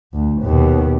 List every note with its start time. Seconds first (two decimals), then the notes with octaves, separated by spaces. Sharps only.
0.13 D2
0.42 D#2 B2